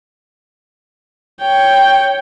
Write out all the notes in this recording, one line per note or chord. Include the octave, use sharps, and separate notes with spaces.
C#5 G5